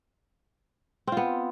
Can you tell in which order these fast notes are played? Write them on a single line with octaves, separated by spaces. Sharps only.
C4 F4 B3